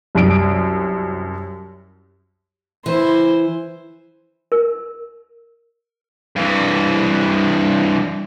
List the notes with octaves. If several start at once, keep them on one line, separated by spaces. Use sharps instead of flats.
C2 F#2 D7
E3 E4 C5
A#4
G2 E3